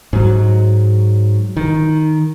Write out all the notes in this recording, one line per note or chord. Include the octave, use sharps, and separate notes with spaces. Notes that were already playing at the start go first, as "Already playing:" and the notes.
G#2 F#3
D#3